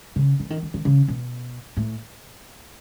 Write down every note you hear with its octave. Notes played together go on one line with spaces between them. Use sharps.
C#3
E3
D#3
D#3
D#3
C#3
B2
A2